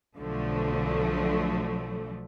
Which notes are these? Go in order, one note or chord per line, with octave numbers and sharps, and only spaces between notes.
B1 D3 F3 F#3 A3